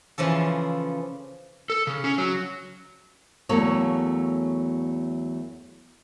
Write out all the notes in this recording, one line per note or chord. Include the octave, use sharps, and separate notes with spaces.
C#3 E3 F3 A4
A4
C#3
C#4
F#3
E2 F#3 A3 A#3 A4 C#5